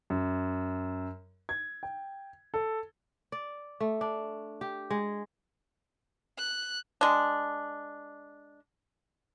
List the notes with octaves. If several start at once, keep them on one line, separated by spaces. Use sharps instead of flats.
F#2
G#6
G5
A4
D5
A3
D4
G4
G#3
F#6
G#3 D4